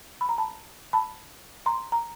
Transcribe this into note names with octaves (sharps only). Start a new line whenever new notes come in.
B5
A#5
A5 B5
A5 B5
A#5 C6
A#5